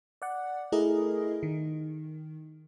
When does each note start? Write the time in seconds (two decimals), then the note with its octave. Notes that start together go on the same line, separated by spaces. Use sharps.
0.22 D5 F#5
0.72 A3 E4 G#4 A#4 D#5
1.43 D#3